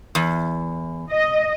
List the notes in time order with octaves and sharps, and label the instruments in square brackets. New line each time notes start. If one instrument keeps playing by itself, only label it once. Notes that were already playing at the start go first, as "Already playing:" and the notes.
[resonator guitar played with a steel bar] E2
[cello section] D#5